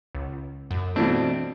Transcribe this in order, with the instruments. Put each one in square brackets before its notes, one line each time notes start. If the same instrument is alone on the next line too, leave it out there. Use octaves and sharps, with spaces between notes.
[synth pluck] C#2
F#2
[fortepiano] B2 E3 A3 [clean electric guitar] C4 D4